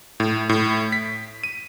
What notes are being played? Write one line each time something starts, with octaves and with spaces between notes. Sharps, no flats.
A2
A2
B6
D#7